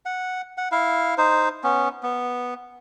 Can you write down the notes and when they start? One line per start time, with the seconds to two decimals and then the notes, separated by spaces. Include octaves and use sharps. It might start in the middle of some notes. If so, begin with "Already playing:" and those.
0.06 F#5
0.58 F#5
0.72 E4 F5
1.18 D#4 C5
1.64 B3 C#4
2.03 B3